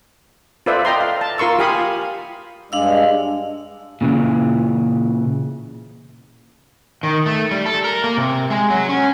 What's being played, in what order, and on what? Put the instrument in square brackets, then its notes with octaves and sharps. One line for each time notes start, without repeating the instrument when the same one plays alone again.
[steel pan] F4 A4 B4 C5 D5 E5
D#5 G5 A#5 C6
F5
A5
F4 A#4 C6 C#6 E6
F4 G4 F5 G#5 B5 D#6
[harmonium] G2 G#3 [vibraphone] D4 F5 E6
[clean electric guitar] A#2 C#3 E3
[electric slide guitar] D#3
A3
G3
A4
A#4
A#3
C3
G#3
F#3
C#4